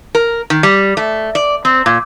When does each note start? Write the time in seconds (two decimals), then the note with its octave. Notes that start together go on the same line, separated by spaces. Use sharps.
0.15 A#4
0.50 D#3
0.63 G3
0.97 A3
1.35 D5
1.65 C4
1.86 A#2